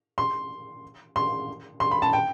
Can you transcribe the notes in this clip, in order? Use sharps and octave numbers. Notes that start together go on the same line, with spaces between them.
C6
C6
C6
B5
A5
G5